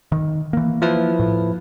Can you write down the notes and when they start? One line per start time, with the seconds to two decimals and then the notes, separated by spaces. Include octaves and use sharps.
0.12 D#3
0.53 E3 A#3
0.82 F3 E4 B4
1.19 A2